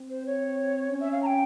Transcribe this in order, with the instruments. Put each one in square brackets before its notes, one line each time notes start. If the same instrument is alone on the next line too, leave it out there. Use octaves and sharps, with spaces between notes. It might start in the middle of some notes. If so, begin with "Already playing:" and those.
Already playing: [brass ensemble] C4
[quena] C5
C#5
[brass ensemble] C#4
[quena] E5
F5
A#5
G5